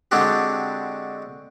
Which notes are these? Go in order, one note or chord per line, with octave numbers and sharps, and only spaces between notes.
D3 G#3 C4 D4 F#4 G4